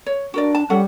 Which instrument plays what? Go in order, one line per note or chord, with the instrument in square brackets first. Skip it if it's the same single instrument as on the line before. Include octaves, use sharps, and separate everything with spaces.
[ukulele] C#5
[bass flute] D4 [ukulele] F#4 A#4 D5
[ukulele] A5
[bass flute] G3 [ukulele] C#4 A4 F#5